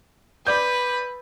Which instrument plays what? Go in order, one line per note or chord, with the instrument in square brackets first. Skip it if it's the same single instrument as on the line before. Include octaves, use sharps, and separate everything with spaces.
[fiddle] B4 [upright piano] D5 G6